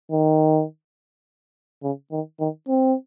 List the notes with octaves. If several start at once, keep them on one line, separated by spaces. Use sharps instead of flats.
D#3
C#3
D#3
D#3
C4